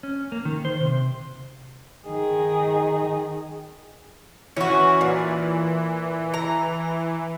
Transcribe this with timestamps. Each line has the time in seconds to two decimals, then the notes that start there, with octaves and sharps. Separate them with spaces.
0.03 C#4
0.32 A#3
0.45 D#3
0.65 C5
0.81 C3
2.07 D#3 G#4
4.56 E3 C#4 F#4
5.01 A#2
6.34 A#5